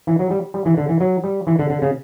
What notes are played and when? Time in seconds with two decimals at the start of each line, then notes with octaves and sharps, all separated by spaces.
0.07 E3
0.19 F#3
0.30 G3
0.54 G3
0.65 E3
0.77 D3
0.89 E3
1.00 F#3
1.24 G3
1.47 E3
1.59 D3
1.70 D3
1.82 C#3